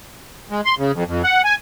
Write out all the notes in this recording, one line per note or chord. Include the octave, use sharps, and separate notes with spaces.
G#3
C6
C#3
F2
F2
F#5
G#5